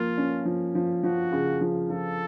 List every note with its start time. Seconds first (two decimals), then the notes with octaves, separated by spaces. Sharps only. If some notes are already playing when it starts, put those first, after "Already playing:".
Already playing: F3 A#3 F4
0.18 C#4
0.45 F3
0.75 F3
1.03 F3 F#4
1.32 C#3
1.61 F3
1.90 F3 A4